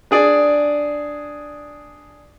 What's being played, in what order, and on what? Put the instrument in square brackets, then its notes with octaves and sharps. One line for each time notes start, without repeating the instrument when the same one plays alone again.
[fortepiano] D4 G#4 D5